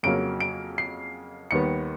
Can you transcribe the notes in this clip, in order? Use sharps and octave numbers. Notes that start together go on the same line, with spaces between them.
F2 C#3 F#3 A#3 D7
D7
C7
D#2 D#3 G3 B3 C#7